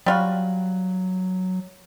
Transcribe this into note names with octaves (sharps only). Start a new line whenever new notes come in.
F#3 G3 F4 F#4